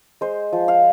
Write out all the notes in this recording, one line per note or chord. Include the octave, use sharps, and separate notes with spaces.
G#3 C5
F3
F5